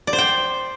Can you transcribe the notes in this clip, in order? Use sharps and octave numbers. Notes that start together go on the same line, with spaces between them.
D5
C5
G5